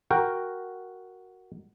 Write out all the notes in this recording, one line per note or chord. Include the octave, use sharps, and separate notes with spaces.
F#4 A#4 G5